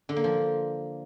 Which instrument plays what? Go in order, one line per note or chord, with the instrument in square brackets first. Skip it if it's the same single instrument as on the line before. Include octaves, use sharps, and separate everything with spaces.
[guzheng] D3
A#3
F3